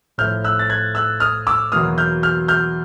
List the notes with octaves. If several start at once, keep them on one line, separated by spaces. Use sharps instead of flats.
A2 F3 A3 F6 G6
E6 F#6
A6
F#6 G#6
E6 F#6
D#6 F6
D6 E6
E2 B2 F#3 A#3 D#6 F6
F6 G6
F6 G6
F6 G6